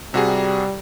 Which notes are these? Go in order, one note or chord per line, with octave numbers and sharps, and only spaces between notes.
C3 G3 F#4 G#4